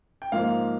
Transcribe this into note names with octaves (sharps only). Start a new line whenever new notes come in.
G5
G#2 F3 A#3 F5